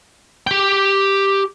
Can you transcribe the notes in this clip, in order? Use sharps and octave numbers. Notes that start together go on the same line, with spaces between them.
G4 G5